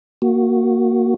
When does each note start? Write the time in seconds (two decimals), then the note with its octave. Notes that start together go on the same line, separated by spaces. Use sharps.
0.22 A#3 F#4